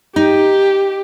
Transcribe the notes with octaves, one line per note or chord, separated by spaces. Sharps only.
D#4 G4